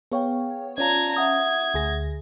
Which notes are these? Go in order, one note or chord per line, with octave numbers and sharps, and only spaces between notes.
B3 G#4 C#5 F5 G5
C#4 F4 D5 A5 A#5 G#6
E5 F#5 D#6 G#6
D2 G#4 A#6